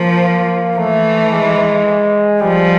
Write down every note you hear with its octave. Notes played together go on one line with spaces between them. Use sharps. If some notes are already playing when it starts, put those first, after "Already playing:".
Already playing: F3 A#3
E3 A3
G#3
F3 G3